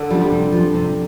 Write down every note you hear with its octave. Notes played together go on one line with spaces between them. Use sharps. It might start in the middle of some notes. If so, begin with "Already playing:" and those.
Already playing: D3
F3 G3 D4
G3
C3
F3 D4
C3